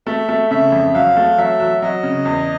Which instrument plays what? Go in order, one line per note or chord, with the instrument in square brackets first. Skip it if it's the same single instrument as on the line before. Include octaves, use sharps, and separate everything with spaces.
[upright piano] A3 [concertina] E5
[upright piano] A3
[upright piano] C#3 [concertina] E5
[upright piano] F2
[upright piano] F#3 [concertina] F5
[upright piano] A3
[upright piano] F#3 [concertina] E5
[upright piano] F#3
[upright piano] F#3 [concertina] D#5
[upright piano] C#3
E2